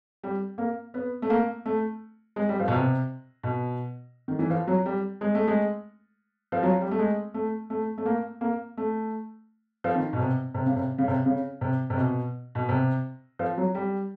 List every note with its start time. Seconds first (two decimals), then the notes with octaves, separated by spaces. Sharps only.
0.24 G3
0.58 A#3
0.94 B3
1.22 A3
1.30 A#3
1.66 A3
2.36 G#3
2.49 G3
2.60 F3
2.68 B2
2.72 C3
3.43 B2
4.28 D#3
4.39 E3
4.50 F3
4.67 F#3
4.86 G3
5.21 G#3
5.35 A3
5.47 G#3
6.52 F3
6.63 F#3
6.81 G3
6.91 A3
6.99 G#3
7.34 A3
7.70 A3
7.98 A3
8.06 A#3
8.41 A#3
8.77 A3
9.84 F3
9.95 D#3
10.13 B2
10.19 C3
10.54 C3
10.66 C#3
10.76 C3
10.98 C#3
11.08 C3
11.26 C#3
11.61 C3
11.90 C3
11.97 B2
12.55 B2
12.69 C3
13.39 F3
13.57 F#3
13.75 G3